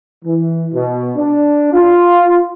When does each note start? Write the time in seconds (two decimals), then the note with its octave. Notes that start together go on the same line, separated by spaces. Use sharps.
0.24 E3
0.73 B2
1.16 D4
1.73 F4